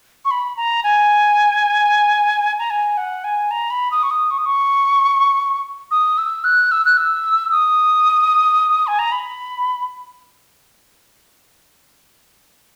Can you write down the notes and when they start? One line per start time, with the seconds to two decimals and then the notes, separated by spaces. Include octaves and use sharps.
0.25 C#6
0.31 B5
0.57 A#5
0.84 G#5
2.59 A#5
2.70 G#5
2.97 F#5
3.24 G#5
3.51 A#5
3.71 B5
3.91 D#6
4.03 C#6
4.11 D#6
4.31 C#6
4.38 D#6
4.46 C#6
5.91 D#6
6.18 E6
6.44 F#6
6.72 E6
6.85 F#6
6.97 E6
7.52 D#6
8.87 G#5
8.99 A#5
9.12 B5